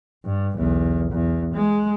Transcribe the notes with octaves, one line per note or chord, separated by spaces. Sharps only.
G2
B1 E2
E2
G#3